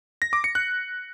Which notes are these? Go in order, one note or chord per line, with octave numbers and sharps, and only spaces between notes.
A#6
D6
C#7
F#6